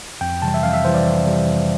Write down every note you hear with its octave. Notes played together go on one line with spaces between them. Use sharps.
F2 G5
C3 E3 G3 A5
E5
F2 F5
E5
C3 E3 G3 C5
D5
F2
C3 E3 G3
F2